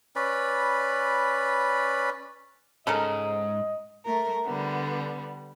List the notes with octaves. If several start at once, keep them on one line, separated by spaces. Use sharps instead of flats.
C#4 B4 D5 B5
G#2 C#3 A4 A#4 D#5
A3 A#4
D3 G3 B3